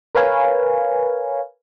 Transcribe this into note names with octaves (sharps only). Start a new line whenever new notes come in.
A#4 B4 C#5 F5 G#5